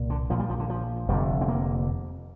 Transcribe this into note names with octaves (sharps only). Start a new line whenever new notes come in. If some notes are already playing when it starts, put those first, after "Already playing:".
Already playing: C2 A#2
D3
A#1 A#2 F3
G3
F3
D3
F3
F1 F2 D3 G3
C4
A#3